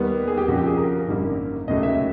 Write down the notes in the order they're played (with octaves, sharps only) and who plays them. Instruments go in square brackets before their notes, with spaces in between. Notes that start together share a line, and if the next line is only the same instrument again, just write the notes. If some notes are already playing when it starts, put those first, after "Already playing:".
Already playing: [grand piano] D#2 D#3 G3 B3
G#4
G4
F2 C#3 F3 F#4
G4
G#4
A#4
A#4
G#1 F#2 D3 G3 A#3
F1 D#2 C#3 F#3 A3 D#5
E5